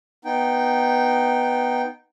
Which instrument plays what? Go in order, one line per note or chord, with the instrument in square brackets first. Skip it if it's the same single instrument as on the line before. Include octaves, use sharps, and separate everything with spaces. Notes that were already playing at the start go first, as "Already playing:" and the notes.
[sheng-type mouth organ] B3 D#4 G5